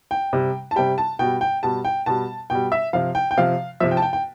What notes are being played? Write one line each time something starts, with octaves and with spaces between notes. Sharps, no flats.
G5
C3 G3
A5
C3 G3 G5
A5
B2 G3 G5
G5
B2 G3 A5
G5
B2 G3 A5
B2 G3 G5
E5
C3 F3 F5
G5
G5
C3 F3 F5
C3 F3 E5
G5
A5
G5
G5